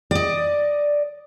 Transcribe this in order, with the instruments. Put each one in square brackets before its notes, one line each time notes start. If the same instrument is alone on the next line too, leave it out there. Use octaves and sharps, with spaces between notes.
[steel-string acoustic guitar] D5 D#5